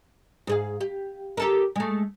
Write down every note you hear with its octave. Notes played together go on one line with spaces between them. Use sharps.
G#2 G#4 F5
G4
G4 A4 A#4
G#3 A3